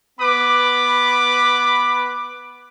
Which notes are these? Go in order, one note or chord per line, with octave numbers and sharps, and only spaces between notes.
B3 B4 B5 D6